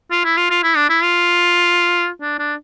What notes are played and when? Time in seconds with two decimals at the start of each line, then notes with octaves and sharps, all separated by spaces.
0.11 F4
0.25 E4
0.37 F4
0.50 F4
0.63 E4
0.77 D4
0.90 E4
1.03 F4
2.21 D4
2.39 D4